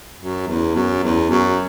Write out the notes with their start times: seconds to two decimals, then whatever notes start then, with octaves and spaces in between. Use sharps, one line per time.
0.19 F#2
0.48 E2
0.75 F#2
1.03 E2
1.30 F#2